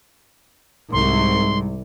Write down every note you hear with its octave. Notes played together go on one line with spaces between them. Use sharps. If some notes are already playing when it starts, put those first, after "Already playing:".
C2 G#2 C6